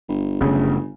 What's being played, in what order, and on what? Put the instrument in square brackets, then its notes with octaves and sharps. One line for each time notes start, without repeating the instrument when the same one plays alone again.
[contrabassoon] G1
[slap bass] F#1 A3 [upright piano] C#3